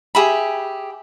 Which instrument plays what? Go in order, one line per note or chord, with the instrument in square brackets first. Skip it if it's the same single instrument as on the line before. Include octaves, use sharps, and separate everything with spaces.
[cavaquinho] G4 G#4 E5 B5